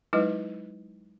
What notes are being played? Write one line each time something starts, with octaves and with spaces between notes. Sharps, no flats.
F#3 G#3 D#4 E4 B4 D#5